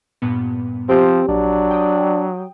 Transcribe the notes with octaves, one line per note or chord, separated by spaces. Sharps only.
G2 A#2 B3
F3 C4 G4
A#1 F#3 D4
G5 D#6